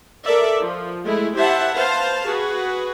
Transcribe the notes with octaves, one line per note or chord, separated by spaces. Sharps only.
A4 A#4 D5 E5
F3
G#3 A3 E4
E4 G4 C5 E5 F#5 A5
B4 C5 F5 A5
F#4 G#4 B4